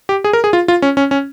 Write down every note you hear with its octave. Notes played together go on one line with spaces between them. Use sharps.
G4
G#4
A#4
G#4
F4
F4
C#4
C#4
C#4